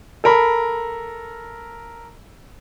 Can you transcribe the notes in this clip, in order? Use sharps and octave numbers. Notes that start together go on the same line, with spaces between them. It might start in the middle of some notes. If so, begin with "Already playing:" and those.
A4 A#4 B5